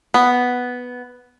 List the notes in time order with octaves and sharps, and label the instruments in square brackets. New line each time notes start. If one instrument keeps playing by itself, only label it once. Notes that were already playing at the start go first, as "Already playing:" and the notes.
[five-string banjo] B3